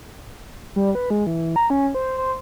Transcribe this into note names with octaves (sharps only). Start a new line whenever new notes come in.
G3
B4
G#3
E3
A#5
C#4
C5
C5